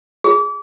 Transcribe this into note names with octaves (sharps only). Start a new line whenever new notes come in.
G#4